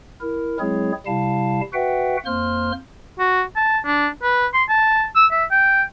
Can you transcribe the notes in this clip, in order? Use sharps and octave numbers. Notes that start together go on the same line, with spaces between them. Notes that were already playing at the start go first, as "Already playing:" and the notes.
E4 A#4
F#3 G#3 C4 E4 G#4 C#5
C3 G3 E4 F5 A5
F#4 B4 E5 F#5 G5
F2 A#3 C5 C6 F6
F#4
A5
D4
B4
C6
A5
E6
E5
G5